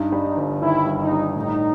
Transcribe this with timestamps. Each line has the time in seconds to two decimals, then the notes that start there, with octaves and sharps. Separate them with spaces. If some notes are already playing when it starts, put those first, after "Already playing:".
Already playing: G2 D#4
0.12 G3
0.37 G1
0.62 D#3 E4
0.87 G2
0.99 D#4
1.12 G3
1.36 A2 D#4